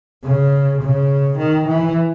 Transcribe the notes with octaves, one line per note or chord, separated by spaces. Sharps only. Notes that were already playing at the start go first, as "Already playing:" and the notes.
C#3
C#3
D#3
E3